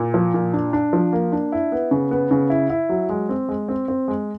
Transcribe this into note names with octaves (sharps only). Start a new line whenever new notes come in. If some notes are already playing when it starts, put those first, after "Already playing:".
Already playing: A#2
F3
A#2
D4
D4
F3
A#3
D4
E4
B3
C#3
B3
C#3
E4
E4
F#3
G#3
C4
G#3
C4
C4
G#3